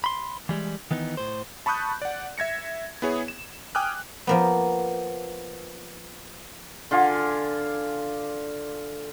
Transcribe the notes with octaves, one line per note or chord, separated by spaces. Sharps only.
B5 C6
E3 G3 G#3
D#3 E3 B3 D#4
A2 C5
A5 B5 C#6 D#6 F#6 G6
D5 F#5
E5 G#6 A#6 C#7
B3 E4 G#4 C#5
E7
G5 G#5 D6 D#6 F6 F#6
F3 A#3 B3
D3 F4 G#5 D6